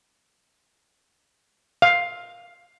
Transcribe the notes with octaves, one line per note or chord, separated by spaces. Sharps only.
F5